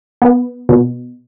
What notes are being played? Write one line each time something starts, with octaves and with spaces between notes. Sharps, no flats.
B3
B2